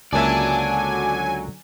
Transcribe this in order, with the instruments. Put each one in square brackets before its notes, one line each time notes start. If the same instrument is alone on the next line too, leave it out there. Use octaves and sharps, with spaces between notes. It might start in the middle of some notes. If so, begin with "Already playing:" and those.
[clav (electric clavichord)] C#2 A#3 E5 [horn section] D3 F#3 [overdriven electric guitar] D5 A5 [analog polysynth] G#5